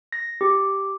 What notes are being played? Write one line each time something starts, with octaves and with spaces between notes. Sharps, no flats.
A#6
G4